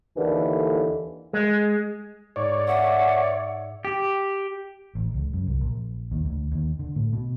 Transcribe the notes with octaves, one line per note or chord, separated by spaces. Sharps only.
D#2 D3 E3
G#3
G#2 C#5 D5
E5 F#5
G4
A1
C#2
F#2
C2
A#1
D#2
D2
D#2
D3
A2
B2